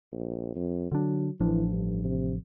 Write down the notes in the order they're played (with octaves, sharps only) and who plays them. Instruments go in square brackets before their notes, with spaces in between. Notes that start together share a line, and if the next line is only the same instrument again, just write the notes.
[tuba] A#1
F2
[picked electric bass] D3 D4 [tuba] F#3
[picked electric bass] A1 F3 D4 [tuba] E3
[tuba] G2
C3